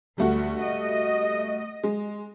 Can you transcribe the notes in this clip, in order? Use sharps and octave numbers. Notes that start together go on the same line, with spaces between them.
D2 G3 A3 F#4
D#5
G#3